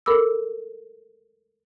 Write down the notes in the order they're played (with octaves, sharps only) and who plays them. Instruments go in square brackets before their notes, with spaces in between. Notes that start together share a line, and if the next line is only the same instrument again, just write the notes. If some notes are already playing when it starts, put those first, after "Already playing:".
[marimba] A4 A#4 B5 D6 E6